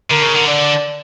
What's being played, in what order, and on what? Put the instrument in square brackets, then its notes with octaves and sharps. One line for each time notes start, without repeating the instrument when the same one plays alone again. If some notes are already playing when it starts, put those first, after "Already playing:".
[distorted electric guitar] D3 [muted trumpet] A#4
[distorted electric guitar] C#3
D3
[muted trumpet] D5